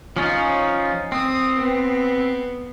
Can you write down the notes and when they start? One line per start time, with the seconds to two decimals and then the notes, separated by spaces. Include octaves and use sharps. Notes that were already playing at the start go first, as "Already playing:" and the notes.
0.16 F3 C#4 D#4 F4
1.12 C4 D#6
1.56 B3